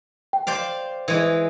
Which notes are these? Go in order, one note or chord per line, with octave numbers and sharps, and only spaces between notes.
G5
C5 D5 F5
E3 G#3